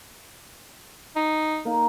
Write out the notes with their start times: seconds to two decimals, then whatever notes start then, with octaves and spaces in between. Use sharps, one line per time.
1.16 D#4
1.65 A#3 D#4